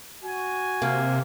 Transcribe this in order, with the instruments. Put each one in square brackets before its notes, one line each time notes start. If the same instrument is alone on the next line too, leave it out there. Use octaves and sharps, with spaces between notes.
[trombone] F#4 [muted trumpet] G#5
[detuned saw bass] C3 [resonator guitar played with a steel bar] A#3